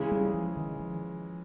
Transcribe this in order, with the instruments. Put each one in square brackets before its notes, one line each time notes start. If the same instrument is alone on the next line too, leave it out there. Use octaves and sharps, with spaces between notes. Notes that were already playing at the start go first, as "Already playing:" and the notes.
Already playing: [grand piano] C#3 E3 G#3
[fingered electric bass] G3
F3
D#3
F3